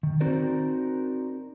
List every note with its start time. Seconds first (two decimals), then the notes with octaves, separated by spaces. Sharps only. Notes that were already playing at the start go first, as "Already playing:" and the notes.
0.03 D#3
0.21 C4 D#4 F#4 A#4 C5 D5